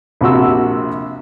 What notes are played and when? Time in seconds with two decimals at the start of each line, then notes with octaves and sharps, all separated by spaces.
0.21 A#1 C3 F#4 E6